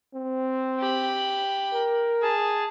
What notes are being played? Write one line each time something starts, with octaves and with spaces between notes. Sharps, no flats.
C4
G4 B5
A#4
G#4 A5